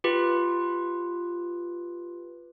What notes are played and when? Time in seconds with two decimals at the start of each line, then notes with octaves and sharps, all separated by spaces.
0.04 F4 G4 B4